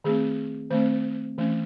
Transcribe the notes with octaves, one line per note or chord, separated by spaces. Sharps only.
D#3 A3 C4 G#4
D#3 A3 C4 C5
E3 A3 C#4